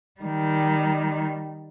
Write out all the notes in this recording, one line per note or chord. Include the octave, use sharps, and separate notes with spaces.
D#3 G3